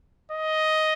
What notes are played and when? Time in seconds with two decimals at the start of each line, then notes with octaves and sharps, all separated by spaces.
0.31 D#5